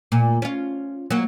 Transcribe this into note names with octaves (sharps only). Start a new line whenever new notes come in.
A#2
C#4 F4
F#3 A#3